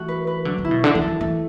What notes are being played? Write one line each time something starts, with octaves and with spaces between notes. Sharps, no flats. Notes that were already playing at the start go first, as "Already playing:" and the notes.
Already playing: E3 A3 F#4
B4
B4
D3 F#3
D3
E4
B2
D3 A4
E3
A4
E3
E3 A3